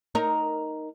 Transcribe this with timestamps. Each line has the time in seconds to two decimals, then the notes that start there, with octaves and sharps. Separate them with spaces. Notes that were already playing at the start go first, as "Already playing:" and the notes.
0.15 D#4 A#4